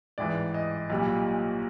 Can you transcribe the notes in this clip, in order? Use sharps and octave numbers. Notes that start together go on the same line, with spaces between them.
A1 G#2 E3 G#3 D5
D#5
B1 A#2 G3